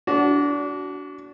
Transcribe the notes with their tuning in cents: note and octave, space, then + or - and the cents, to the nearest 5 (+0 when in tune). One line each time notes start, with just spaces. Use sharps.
D4 -25 F#4 +10